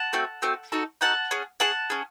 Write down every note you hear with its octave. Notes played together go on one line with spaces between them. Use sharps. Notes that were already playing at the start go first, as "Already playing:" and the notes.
Already playing: F#5 A5
A3 C4 F#4
A3 C4 F#4
D#4 F#4 A4
D#4 F#4 A4 F#5 A5
C#4 G#4
C#4 G#4 F#5 A5
C#4 G#4